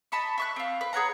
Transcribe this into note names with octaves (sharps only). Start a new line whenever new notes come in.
D#5 A5 B5 C#6
E5 C#6 F#6
C4 F4
B4
G#4 C#5 F#5 A#5